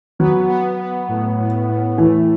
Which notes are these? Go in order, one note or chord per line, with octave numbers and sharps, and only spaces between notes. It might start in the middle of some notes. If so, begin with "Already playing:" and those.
F#3 B3
B3
B3
A2
A2
A2
E3 A3